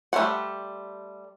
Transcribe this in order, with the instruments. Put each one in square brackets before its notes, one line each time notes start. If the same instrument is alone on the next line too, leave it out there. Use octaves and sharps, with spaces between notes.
[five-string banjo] G3 A3 C#4 C5 F#5